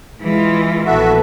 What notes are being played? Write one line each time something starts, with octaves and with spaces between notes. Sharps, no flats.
E3 G#3 F4
A#1 B3 F#4 A4 E5